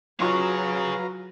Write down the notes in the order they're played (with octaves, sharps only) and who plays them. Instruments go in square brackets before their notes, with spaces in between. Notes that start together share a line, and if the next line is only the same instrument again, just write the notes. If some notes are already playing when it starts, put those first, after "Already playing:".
[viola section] F#3 [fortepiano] F4 C#6 [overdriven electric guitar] G#4 C#5 [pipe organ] B4 F5 A#5